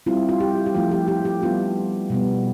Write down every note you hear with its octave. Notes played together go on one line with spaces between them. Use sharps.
G3 C4 E4 F4
F4
G4
G4
F3 A3 E4 F4
G4
G4
G4
G3 B3 D4 F4
B2 G3 B3